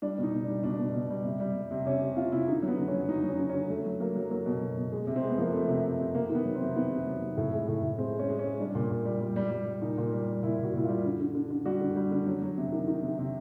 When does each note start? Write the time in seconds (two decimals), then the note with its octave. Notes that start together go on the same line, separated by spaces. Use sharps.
0.02 G3 D4
0.18 B2 D#4
0.34 B2
0.43 D4
0.48 G3
0.63 B2 D4
0.79 B2
0.94 B2
1.10 G3
1.25 C3
1.40 G3
1.56 G3
1.71 C3
1.86 C3 C#4
2.01 C3
2.17 C3 F4
2.32 C3 E4
2.48 D3 D#4
2.63 F#3
2.68 B3
2.78 D3
2.88 C#4
2.94 F#3
3.09 F#3 D#4
3.23 F#3
3.28 C#4
3.39 D3
3.49 C#4
3.54 D3
3.70 F#3 A3
3.85 F#3
4.00 F#3 A#3
4.16 F#3
4.31 F#3 A#3
4.46 B2
4.61 F#3
4.77 B2
4.92 G#3
5.07 C3
5.16 C4
5.23 G#3
5.29 B3
5.38 F3 A#3
5.53 C3 A3
5.69 C3
5.84 C3
5.99 C3
6.14 C3 A#3
6.30 D#3
6.35 B3
6.45 F#3
6.55 C4
6.61 C3
6.76 D#3 B3
6.91 C3
7.07 F#3
7.22 C3
7.37 A2
7.53 G#3
7.68 A2
7.83 A2
7.98 G#3 C4
8.13 G#3
8.19 C#4
8.29 G#3
8.39 C#4
8.44 G#3
8.59 G3 D4
8.75 A#2
8.90 A#2
9.05 G3
9.20 G3
9.36 G3
9.51 G3
9.66 G3
9.82 A#2 D#4
9.98 A#2
10.13 G3
10.28 G3
10.43 A#2 E4
10.58 A#2
10.63 F#4
10.73 A#2 E4
10.84 G3 F4
11.04 D3
11.20 D3
11.35 D3
11.51 D3
11.65 G3 F#4
11.81 D3
11.96 G3
12.11 D3
12.26 F#3
12.42 F#3
12.58 C3
12.72 D#3
12.88 D#3
13.03 C3
13.19 C3